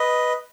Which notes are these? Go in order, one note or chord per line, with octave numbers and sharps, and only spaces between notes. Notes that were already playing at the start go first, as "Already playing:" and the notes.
Already playing: B4 D#5